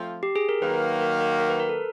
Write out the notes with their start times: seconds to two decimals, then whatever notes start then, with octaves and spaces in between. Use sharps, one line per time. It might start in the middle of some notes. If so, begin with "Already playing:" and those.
Already playing: F3 A3 C4 F4
0.23 G4
0.36 G#4
0.49 A#4
0.62 D#3 F#3 A#3 B4
1.01 A#4
1.20 A#4
1.40 A#4
1.50 B4
1.60 A#4
1.69 A4